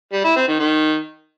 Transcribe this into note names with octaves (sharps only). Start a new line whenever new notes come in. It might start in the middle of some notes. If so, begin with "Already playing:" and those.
G3
E4
C4
D#3
D#3